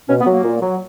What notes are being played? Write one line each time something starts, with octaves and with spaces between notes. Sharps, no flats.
B2 C#4
B3
F#3
A#3
A#2
F#3